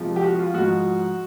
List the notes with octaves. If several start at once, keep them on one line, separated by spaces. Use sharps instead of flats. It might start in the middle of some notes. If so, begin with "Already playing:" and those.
Already playing: F2 C3 F3 G#3
G4
F#4
F4
G#2 F3 G#3 F#4